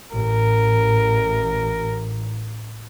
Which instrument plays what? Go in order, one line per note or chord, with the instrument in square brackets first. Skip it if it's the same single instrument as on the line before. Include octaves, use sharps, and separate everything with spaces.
[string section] A1 [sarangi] A#4